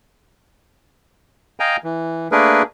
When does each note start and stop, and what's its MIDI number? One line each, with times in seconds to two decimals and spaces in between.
1.60 1.77 75
1.60 1.77 77
1.60 1.77 79
1.60 1.77 80
1.60 1.77 82
1.84 2.28 52
2.32 2.62 57
2.32 2.62 58
2.32 2.62 62
2.32 2.62 68
2.32 2.62 70
2.32 2.62 71